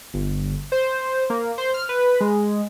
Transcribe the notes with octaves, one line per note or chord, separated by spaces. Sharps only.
G1
C5
A#3
C5
F6
B4
G#3